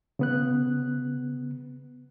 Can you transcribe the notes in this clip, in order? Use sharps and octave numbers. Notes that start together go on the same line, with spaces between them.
C#3 B3 F#6